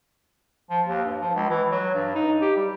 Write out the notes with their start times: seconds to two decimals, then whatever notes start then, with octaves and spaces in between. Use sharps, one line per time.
0.70 F3
0.86 D#2
1.06 G2
1.20 F3
1.35 C#2
1.49 E3
1.71 F#3
1.95 G2
2.15 D#4
2.41 G4
2.57 G3